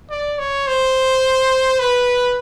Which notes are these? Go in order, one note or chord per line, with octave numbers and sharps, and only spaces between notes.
D5
C#5
C5
B4